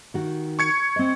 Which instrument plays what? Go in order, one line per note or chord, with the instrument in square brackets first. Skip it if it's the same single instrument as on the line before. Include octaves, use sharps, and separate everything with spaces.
[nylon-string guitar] D#3 F#4
[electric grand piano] C#6 G#6 C#7
[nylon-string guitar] C4 D#5